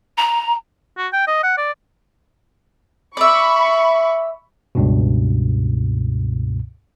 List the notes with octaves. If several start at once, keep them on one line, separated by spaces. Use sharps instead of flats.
A#5
F#4
G5
D#5
F#5
D5
D5 E5 B5 C#6
C#2 G2 B2